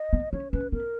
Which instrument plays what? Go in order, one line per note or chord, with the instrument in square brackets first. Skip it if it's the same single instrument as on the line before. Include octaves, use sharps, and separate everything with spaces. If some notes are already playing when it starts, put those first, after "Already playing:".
Already playing: [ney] D#5
[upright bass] B3
[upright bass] C#4 [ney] C#5
[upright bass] C#4 [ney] B4
[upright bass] B3 [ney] A#4